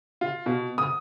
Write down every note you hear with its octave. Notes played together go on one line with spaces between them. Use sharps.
F4
B2
D#6